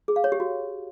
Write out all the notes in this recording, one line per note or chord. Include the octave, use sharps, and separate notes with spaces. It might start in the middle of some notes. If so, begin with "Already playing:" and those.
G#4
F5
C#5
G4
F#4